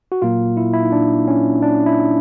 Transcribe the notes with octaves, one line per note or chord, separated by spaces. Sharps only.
F#4
A#2 F#3 A#3 F4
E4
E4
D#4
D4
C#4
D4
E4